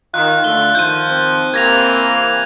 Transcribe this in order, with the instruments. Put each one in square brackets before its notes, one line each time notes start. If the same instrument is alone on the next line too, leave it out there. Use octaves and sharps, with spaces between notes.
[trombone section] D#3 [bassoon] F4 [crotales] F#6
[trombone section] D3 A3 [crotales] G7
[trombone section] D#3 F3 [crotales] G6 D#7
[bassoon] C4
[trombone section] C3 E3 A#3 [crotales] G#6 A#6 F7